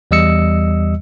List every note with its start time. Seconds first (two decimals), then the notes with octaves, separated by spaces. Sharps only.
0.11 E2 G3 D#5 E6 C#7